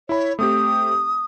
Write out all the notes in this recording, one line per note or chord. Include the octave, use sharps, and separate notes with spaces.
E4 C#5 B5
A3 C4 G4 D#6